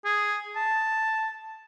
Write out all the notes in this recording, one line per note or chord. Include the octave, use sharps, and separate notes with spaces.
G#4
A5